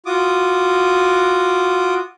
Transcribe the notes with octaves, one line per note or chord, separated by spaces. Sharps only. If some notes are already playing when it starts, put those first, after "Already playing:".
F4 F#4 D6 D#6